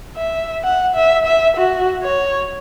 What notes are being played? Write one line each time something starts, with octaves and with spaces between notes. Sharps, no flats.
E5
F#5
E5
E5
F#4
C#5